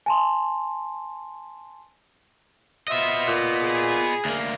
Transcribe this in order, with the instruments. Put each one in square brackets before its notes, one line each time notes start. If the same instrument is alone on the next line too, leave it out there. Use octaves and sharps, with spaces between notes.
[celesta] G#5 A5 C6
[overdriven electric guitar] B3 D#5 [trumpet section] F4 C5 E5
[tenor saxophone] A#2
[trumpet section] G#4
[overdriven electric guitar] D2 A#3